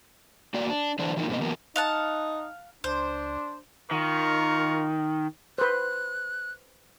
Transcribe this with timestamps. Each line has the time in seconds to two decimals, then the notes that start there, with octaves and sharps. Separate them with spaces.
0.54 A#3 F#4 D5
0.70 D4
0.99 D3 E3 D4 C5 D5
1.17 E3 F3 A#3 D4 D#4
1.29 G#2 C3 G#3 A#3 D#5
1.41 E3 F#3 A#3 B3 A#4
1.76 D#4 F5 F#5 A5
2.84 C#2 D4 C5
3.91 D#3 F4 A#4 C#6
5.58 B4 C5 F#6